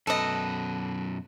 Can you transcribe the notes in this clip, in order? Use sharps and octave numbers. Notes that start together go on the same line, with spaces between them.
F#2 B2 A4 B4 D#5